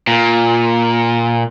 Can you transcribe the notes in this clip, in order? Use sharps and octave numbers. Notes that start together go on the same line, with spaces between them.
A#2